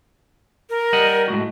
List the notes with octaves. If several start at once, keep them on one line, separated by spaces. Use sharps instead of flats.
A#4
G3 D#5 F#5
A2 G#3 F#4